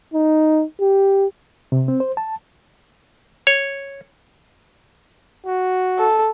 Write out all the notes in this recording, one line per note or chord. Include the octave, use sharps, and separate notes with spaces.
D#4
G4
C3
C4
C5
A5
C#5
F#4
A4